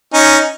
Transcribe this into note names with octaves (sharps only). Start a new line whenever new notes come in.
C#4 D#4